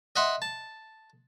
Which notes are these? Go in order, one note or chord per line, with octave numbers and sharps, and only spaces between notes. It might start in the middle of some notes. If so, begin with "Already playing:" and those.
D#5 E5 F#5 C6
A5